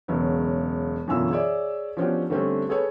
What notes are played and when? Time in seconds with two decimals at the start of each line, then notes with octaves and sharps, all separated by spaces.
0.08 E1 C#3 F#3 B3
1.07 F#2 B2 D3 E3 F4 E6
1.30 G#4 C#5 D5 E5
1.97 F3 B3 C#4 D4 F#4 G4
2.30 D3 G3 A3 C4 C#4
2.69 G#4 A4 B4 C#5